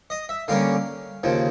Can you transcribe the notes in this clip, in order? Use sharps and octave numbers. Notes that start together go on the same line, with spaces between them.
D#5
E5
D3 G3 A#3 C#4 F5
D#2 C#3 F3